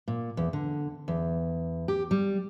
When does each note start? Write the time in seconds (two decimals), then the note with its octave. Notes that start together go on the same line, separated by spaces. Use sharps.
0.08 A#2
0.37 E2
0.53 D3
1.08 E2
1.88 G4
2.11 G3